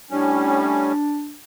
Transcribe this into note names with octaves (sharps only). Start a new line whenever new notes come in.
A2 G3 C#4 D4